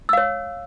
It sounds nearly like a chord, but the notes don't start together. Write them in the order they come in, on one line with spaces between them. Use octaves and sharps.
E6 F5 C#5